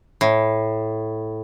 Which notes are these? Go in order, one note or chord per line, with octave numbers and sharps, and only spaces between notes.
A2